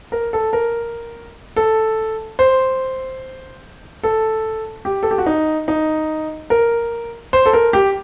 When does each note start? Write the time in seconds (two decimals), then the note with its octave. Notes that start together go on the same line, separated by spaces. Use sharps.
0.12 A#4
0.33 A4
0.53 A#4
1.56 A4
2.39 C5
4.03 A4
4.85 G4
5.03 A4
5.11 G4
5.18 F#4
5.26 D#4
5.68 D#4
6.50 A#4
7.33 C5
7.46 A4
7.53 A#4
7.73 G4